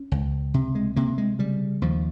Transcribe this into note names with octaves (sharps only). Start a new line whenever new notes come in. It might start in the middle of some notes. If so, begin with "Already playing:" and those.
Already playing: C#4
C#2
C3
G#3
C3 A#3
G#3
C#3 G3
D#2 F3